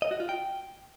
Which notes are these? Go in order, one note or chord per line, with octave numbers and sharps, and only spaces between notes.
D#5
F#4
F4
G5